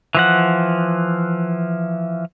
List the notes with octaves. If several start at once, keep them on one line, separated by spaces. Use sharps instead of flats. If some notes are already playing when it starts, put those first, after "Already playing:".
E3 F3 F#5